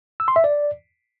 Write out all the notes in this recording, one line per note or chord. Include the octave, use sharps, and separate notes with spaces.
E6
C6
E5
D5